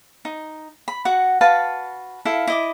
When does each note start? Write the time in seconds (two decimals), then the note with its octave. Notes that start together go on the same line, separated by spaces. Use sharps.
0.25 D#4
0.88 B5
1.05 F#4 F#5
1.41 F#4 B4 F5 A5
2.25 E4 A4 F5
2.47 E4 D#5 D6